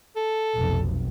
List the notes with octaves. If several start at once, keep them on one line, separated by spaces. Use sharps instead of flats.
A4
F1 B1